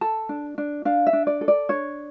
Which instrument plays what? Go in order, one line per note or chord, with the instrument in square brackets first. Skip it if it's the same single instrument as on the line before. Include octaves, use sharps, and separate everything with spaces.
[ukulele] A4 A5
D4
D4
D4 F5
E5
D4
D5
A4
D5
D4 C#5